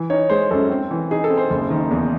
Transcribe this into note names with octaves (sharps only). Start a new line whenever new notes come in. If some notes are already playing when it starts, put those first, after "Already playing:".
Already playing: E3
D#4 C#5
G#3 C5
F#2 A4
C4
E3
D#4 G#4
A4
C4
C5
F#1
D#3
E2